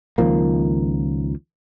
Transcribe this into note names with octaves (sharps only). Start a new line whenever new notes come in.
C#2 D#3 F3 A#3